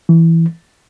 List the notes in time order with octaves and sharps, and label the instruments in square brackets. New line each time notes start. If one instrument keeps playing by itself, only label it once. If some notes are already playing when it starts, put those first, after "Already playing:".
[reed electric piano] E3